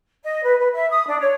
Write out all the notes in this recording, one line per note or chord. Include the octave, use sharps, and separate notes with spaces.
D#5
B4
B4
E5
D#6
D4
C#5